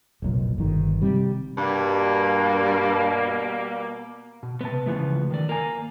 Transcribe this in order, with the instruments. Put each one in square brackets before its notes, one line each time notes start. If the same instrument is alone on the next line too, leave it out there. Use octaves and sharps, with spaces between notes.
[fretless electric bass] F1 B1 A#2
G1 D#3
C3 G3
[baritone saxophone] G2 [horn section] B2 G3 A#3
[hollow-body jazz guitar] B2
[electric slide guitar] C3 B3 [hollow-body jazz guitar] B4 A5
[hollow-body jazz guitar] C#2 F3 B3 [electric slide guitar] C#3 E3 A3
[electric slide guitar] D#3 D5
[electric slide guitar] A#3 A#5 [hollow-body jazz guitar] A#4 G#5